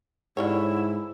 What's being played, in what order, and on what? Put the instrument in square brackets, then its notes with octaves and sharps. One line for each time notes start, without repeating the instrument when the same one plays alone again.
[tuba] G#2 [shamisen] D3 G3 C#5 [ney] E4